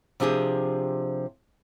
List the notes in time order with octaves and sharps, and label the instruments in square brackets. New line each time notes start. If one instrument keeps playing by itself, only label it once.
[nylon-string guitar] C3 F3 D4 G4 G#4